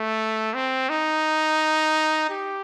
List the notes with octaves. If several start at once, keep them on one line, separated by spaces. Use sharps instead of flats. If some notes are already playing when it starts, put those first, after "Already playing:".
Already playing: A3
C4
D#4
G4